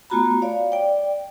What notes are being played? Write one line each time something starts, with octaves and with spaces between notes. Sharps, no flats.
A3 B3 F4 F#4 A#5 B5
C#5 D5 F5
D5 G5